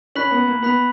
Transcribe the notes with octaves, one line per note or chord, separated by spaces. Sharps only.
C#4 B5 F#6 B6 F#7
B3
A#3
B3 B5 F#6 B6 F#7